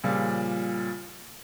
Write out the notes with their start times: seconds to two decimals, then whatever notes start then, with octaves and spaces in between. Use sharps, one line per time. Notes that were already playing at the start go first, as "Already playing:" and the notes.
0.04 A#2 C#3 F3 G3